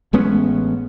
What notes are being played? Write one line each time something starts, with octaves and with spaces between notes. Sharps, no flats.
A1 G#3 B3 C#4